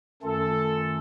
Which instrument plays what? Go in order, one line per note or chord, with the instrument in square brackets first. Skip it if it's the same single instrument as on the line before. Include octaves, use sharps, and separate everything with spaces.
[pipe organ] F#2 D#3 A3 C#4 F4 [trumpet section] A4